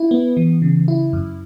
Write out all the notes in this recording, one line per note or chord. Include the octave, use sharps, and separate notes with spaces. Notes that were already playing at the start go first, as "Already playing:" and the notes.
Already playing: E4
B3
E3
C#3
E4
F#2